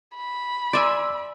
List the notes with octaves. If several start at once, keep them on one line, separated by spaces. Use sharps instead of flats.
B5
D5 E5 G#5 C6 E6